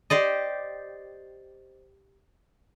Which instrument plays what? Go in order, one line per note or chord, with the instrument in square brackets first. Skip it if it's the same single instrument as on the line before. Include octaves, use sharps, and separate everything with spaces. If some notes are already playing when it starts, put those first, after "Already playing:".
[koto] G4 C5 D5 D#5